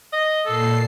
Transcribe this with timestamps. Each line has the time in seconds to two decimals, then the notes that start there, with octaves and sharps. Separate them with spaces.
0.13 D#5
0.46 A#2 A4 C7